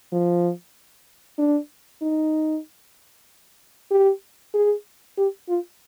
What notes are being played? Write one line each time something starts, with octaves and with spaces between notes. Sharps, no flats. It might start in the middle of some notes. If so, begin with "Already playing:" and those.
F3
D4
D#4
G4
G#4
G4
F4